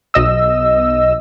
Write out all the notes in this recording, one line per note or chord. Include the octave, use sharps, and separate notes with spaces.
B1 D#5 E6